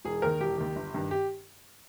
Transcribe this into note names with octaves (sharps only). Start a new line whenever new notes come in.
E1 G#4
D#2 D#3 A#4
E1 G4
D#2 D#3
G1
G2 D#3
G4